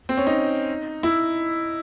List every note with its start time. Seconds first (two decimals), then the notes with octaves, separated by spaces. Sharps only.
0.09 C4
0.18 C#4
0.27 D#4
1.03 E4